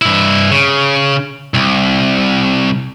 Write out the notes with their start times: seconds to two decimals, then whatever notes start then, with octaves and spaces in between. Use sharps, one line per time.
0.02 G2 E4
0.51 C#3
1.54 C2